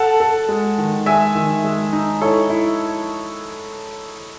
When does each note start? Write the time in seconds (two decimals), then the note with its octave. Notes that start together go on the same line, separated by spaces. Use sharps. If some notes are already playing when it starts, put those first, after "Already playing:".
Already playing: A4 F#5 A5
0.20 A4
0.49 G#3
0.78 D#3
1.06 G#3 E5 G#5
1.35 D#3
1.64 G#3
1.93 D#4
2.21 E4 A4 C#5
2.50 E4